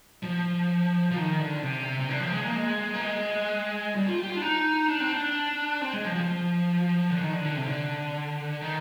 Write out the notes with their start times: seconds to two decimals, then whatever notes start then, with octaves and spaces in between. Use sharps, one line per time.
0.23 F3
1.11 F3
1.16 D#3
1.39 D3
1.62 C3
1.99 C3
2.09 D3
2.20 F3
2.32 G#3
2.44 A#3
2.55 G#3
2.94 A#3
3.01 G#3
3.95 G3
4.07 F4
4.19 G4
4.30 F4
4.36 D4
4.42 D#4
4.88 D4
5.00 C4
5.12 D4
5.81 C4
5.93 G#3
6.05 F3
6.16 F3
7.10 D3
7.21 D#3
7.32 D3
7.44 D3
7.56 C3
7.68 D3
8.61 D#3